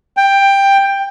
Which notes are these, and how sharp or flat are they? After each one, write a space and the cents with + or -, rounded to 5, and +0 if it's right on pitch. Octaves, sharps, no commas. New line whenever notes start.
G5 +10